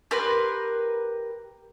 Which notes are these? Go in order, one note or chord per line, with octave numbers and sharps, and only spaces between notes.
G4 A#4 B4 C6